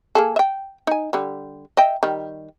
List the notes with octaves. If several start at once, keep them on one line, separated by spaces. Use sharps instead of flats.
A#3 G#4 A4
E5 G5
D#4 G#5
D3 G3
D#5 E5 G5
D#3 G3